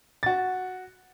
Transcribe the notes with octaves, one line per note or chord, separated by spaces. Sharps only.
F#4 A6